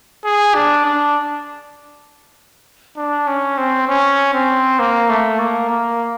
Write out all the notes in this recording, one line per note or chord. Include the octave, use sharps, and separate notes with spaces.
G#4
D4
D4
D4
C#4
C4
C#4
C4
A#3
A3
A#3
A#3